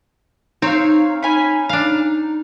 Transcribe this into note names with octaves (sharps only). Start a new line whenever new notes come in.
C4 D#4 C#5 F5
C#4 G#5 B5
D4 F5